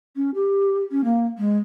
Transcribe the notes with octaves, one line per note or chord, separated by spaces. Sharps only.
C#4
G4
C#4
A#3
G#3